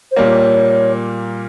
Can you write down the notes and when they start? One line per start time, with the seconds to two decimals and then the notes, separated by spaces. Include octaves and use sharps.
0.11 C5
0.16 A#2 G3 A#3 C#5